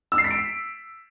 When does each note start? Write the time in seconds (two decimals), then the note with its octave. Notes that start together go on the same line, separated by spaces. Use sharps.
0.12 E6
0.18 C7
0.24 B6
0.31 D7